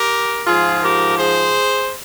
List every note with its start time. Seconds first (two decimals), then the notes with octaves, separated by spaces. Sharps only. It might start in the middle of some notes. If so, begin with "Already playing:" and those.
Already playing: G4 A#4
0.47 G#2 F3 F4 G#4
0.83 G4 A#4
1.19 G#4 C5